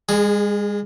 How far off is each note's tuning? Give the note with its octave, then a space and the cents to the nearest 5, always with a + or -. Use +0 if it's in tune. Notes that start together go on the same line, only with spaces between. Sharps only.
G#3 -40 G#4 +0